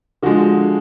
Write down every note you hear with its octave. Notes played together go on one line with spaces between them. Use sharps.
D3 F3 G#3 F#4